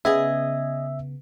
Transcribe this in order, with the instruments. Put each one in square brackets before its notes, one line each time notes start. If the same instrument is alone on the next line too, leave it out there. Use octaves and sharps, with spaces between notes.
[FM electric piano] C#3 B3 [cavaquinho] G#4 D#5 G#5 [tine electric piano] E5